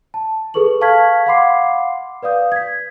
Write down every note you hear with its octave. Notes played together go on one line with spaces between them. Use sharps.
A5
G#4 A4 B4 C#6 F#7
F5 A5 C#6 F6 G#6 B6
F5 F#5 B5 C6 D6 C7
B4 D5 F5 D#6 G6
G#6 B6